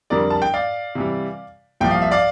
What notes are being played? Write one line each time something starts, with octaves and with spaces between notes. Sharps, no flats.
F2 D3 G3 A#4 D5
A5
G5
D5 F5
C3 E3 G3
C2 A#2 F3 G5
F5
E5
D5 F5